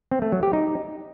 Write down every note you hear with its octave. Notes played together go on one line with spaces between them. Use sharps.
C4
A3
F#3
G4
D#4